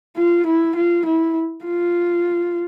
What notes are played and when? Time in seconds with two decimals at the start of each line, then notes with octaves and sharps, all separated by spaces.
0.17 F4
0.47 E4
0.76 F4
1.06 E4
1.65 F4